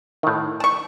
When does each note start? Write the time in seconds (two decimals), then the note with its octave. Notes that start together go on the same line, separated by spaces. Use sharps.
0.23 A2 D#3
0.60 A5 C#6